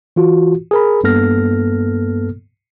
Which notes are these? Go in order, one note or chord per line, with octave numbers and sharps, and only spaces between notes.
E3 F4 F#4
G#4 A#4 B5
G2 A#3 B3 A4 F6 A#6